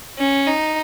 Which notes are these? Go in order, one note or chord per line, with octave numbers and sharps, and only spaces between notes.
C#4
D#4